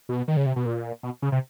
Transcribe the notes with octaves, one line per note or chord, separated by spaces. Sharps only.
B2
D#3
C#3
C3
B2
A#2
B2
C#3
C3